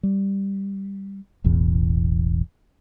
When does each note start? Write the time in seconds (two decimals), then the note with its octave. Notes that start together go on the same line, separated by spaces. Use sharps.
0.03 G3
1.44 E1 A1 E2